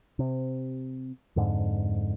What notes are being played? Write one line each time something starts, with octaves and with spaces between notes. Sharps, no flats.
C3
F2 G#2 D3